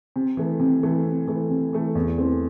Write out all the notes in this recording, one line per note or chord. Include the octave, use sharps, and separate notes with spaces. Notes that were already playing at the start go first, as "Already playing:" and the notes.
C3
E3 A3
C3
E3 A3
C3
E3 A3
C3
E3 A3
E2
C3 E3 A3 C4